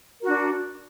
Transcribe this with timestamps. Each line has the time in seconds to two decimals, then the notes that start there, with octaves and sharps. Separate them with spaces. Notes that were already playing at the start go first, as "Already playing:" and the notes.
0.20 A#4
0.23 F#4
0.26 D4